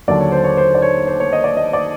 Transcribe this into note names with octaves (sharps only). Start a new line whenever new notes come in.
D#2 D3 F#3 D5
C#5
C5
C#5
C5
D5
C#5
C5
C#5
D#5
D5
D#5
D5